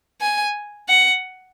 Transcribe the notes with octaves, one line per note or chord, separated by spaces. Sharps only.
G#5
F#5